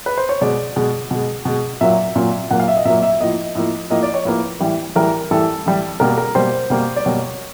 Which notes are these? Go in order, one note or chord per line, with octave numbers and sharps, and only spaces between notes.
B4
C5
C#5
B2 G#3 D5
B2 G#3
B2 G#3
B2 G#3
A#2 F#3 A#3 E5
A#2 F#3 A#3
A#2 F#3 A#3 F#5
F5
E5
D#5
A#2 F#3 A#3 E5
E5
A2 F3 A#3 D#5
A2 F3 A#3
A2 F3 A#3 D#5
D5
C#5
A2 F3 A#3 B4
A2 E3 G3
A2 E3 G3 A#4
A2 E3 G3 A4
A2 E3 G3
B2 G3 A#3 A#4
A#4
B2 G3 A#3 C5
B2 G3 A#3
D5
B2 G3 A#3 C#5